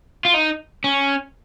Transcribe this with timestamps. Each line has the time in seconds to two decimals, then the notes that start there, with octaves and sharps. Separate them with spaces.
0.25 F4
0.34 D#4
0.84 C#4